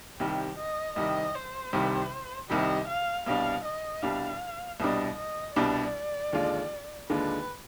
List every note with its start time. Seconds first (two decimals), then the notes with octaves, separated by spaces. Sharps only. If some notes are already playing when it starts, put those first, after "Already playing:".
0.20 C2 C3 D#3 G3 G4
0.58 D#5
0.96 C2 C3 D#3 G3 D#5
1.35 C5
1.73 C2 C3 D#3 G3
2.50 C2 C3 D#3 G3 D#5
2.88 F5
3.26 C2 B2 G3 D4 F5
3.65 D#5
4.03 C2 B2 G3 D4 F5
4.79 C2 B2 G3 D4 D#5
5.18 D#5
5.56 C2 B2 G3 D4 D5
6.33 D#2 D3 G#3 D4 F4
7.10 D#2 D3 G#3 D4 F4 B4